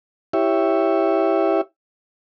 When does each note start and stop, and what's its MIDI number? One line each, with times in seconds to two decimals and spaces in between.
0.33 1.61 64
0.33 1.61 67
0.33 1.61 73
0.33 1.61 76